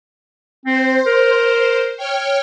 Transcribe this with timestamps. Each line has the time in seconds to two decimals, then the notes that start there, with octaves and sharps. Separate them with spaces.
0.66 C4 C5
1.06 A#4
1.97 C#5 G5 F6